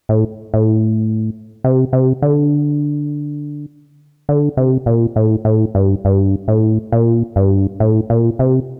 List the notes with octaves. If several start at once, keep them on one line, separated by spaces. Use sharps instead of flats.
A2
A2
C3
C3
D3
D3
C3
A#2
A2
A2
G2
G2
A2
A#2
G2
A2
A#2
C3